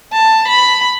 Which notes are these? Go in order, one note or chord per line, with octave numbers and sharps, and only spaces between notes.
A5
B5